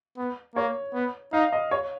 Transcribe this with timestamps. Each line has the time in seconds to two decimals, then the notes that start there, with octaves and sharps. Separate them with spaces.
0.17 B3
0.56 A#3 C#5
0.94 B3
1.33 D#4 F5
1.53 D#5
1.71 C#5